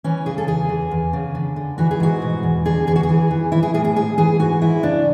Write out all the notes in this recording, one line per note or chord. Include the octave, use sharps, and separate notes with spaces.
E3 C#4
C#3 G#4
A4
E2 G#4
E2
E2
C#3
D3
D3
E3 F#4
G#4
G#2 F#4
B2
E2
D3 G#4
E2 G#4
F#4
G#4
E3
E3
E3 E4
G#4
A2 G#4
G#4
G#2 G#4
E3 G#4
E3 F#4
G#2 E4
C#3 D4